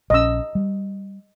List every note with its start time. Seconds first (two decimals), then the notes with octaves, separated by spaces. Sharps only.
0.10 A#1 C#4 D#5 E6
0.55 G3